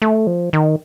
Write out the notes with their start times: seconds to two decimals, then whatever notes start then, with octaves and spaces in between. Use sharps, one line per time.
0.02 A3
0.27 F3
0.53 D#3